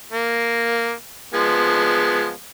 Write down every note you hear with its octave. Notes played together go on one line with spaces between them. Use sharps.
A#3
F3 G#3 B3